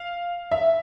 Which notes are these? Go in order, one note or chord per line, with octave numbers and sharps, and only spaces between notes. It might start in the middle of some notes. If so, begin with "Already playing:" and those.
Already playing: F5
E5